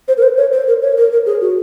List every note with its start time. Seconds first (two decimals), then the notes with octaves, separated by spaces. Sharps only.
0.08 C5
0.17 A#4
0.23 C5
0.37 C#5
0.53 C5
0.68 A#4
0.82 C#5
0.97 A#4
1.12 A#4
1.26 G#4
1.41 F#4